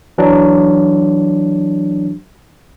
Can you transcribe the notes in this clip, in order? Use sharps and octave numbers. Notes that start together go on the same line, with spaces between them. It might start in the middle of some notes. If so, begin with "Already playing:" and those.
E3 F#3 D4